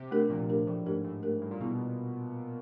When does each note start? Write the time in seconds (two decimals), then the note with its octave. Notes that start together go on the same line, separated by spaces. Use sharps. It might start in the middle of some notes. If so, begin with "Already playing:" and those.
Already playing: C3
0.11 A3 D4 G4 A#4
0.30 A#2 F3
0.49 A3 D4 G4 A#4
0.67 A2 F3
0.86 G#2 A3 D4 G4 A#4
1.05 A2 F3
1.23 A3 D4 G4 A#4
1.42 A2 G3
1.51 A#2
1.60 B2 B3 E4 G#4